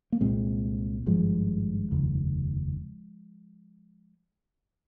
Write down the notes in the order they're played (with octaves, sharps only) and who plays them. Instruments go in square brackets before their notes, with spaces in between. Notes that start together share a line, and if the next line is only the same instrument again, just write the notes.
[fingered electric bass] A#3
C2 A#2 G#3 C4
G#1 G2 F3 G#3
F1 D#2 C#3